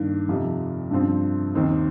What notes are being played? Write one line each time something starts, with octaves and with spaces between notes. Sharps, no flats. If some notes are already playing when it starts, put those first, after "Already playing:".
Already playing: G2 D#3 A#3
F2 C3 F3 D#4 G4
G2 F3 C4
D#2 D#3 C4 D#4